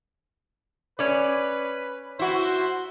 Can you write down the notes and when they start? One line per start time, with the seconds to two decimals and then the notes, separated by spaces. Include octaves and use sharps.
0.99 C#4 B4 D5
2.19 E4 F#4 C5